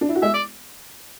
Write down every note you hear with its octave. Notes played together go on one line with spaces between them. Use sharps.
D4
E4
F#4
G#3 G#4 E5
D5